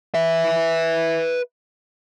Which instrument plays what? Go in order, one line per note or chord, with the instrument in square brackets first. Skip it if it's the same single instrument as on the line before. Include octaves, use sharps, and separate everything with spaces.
[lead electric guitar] B4 E5